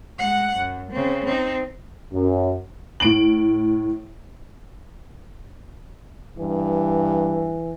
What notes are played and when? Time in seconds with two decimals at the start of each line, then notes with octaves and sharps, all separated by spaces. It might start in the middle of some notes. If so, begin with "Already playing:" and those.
0.18 G#3 F#5
0.56 F#2
0.91 C#3 C4
1.26 C4 D#4
2.12 F#2
3.00 A2 D7 F#7
6.38 G2 E3